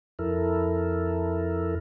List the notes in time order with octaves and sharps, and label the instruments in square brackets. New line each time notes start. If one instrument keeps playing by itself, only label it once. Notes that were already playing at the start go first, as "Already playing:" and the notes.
[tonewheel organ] F2 E4 A4 A#4